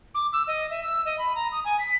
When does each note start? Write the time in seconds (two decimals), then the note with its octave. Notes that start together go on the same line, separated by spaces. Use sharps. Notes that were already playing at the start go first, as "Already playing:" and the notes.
0.14 D6
0.33 E6
0.47 D#5
0.70 E5
0.84 E6
1.05 D#5
1.18 B5
1.35 A#5
1.52 D#6
1.65 G#5
1.79 B6